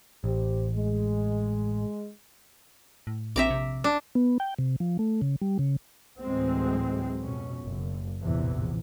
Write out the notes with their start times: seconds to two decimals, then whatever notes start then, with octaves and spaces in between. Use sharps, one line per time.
0.24 A1 G4 C5
0.75 G#3
3.07 A2
3.36 A#1 C4 E5 A#5 D6
3.50 C3
3.84 D4
4.15 B3
4.40 G5
4.58 C3
4.80 F3
4.99 A3
5.22 C#3
5.42 G3
5.59 C#3
6.21 D2 A2 E3 F#3 G#3 C4
7.22 F2 B2 C#4
7.63 F#1
8.22 A#1 E2 A2 C3 E3